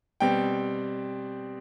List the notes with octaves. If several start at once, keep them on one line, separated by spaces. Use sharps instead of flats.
B2 G3 C4 G5